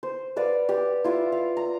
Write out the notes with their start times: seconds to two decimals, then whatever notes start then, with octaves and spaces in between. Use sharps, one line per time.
0.03 C5
0.36 B4 D5 F5 F#5
0.69 G4 B4
1.04 E4 F4 F#5 D6
1.32 F5
1.57 A#5